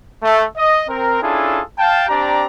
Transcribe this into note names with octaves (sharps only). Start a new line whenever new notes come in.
A3
D#5
C4 A#4
C#4 D4 E4 F4 G#4 A4
F5 G5 A5
C4 D4 G4 D5 A#5